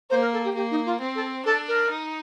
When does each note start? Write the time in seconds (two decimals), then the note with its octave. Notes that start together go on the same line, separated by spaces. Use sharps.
0.10 A#3 C5
0.21 A#4
0.33 A4
0.44 G4
0.55 A#3 G4
0.71 D#4
0.86 F4
1.01 C4
1.15 A4
1.46 D4 A4
1.68 A#4
1.90 D#4